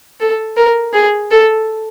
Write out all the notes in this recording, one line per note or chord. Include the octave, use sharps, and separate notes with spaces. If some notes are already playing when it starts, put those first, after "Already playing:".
A4
A#4
G#4
A4